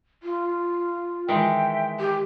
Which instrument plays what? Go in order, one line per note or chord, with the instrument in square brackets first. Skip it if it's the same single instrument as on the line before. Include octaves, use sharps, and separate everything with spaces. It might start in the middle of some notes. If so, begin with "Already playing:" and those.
[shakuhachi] F4
[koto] D#3 E3 G#3 [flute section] E5 G5
[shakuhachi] G4